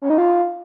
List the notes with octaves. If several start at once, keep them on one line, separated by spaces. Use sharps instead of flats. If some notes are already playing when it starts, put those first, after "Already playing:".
C#4
D#4
F4